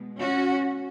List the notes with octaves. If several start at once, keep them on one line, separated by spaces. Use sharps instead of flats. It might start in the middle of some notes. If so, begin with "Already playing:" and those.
Already playing: B2 G#3
C#4 F#4